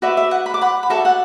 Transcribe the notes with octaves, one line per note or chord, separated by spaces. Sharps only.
F#4 B4 D5 E5
E5
F#5
B5
D6
F#5 B5
B5
F#4 A4 D5 E5 A5
F#5